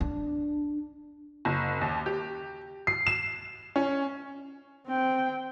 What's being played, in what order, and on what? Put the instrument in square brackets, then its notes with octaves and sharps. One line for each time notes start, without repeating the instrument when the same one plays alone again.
[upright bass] D4
[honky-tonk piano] F#1
D#2
G4
C7
E7
C#4
[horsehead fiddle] C4 G5